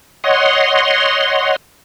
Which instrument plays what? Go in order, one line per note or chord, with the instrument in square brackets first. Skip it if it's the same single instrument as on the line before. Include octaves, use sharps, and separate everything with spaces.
[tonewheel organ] C#5 D#5 F#5 C6